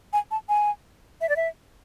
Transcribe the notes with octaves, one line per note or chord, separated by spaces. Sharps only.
G#5
A5
G#5
E5
D5
E5